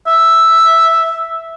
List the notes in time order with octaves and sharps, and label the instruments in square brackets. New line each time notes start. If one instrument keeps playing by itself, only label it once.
[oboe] E5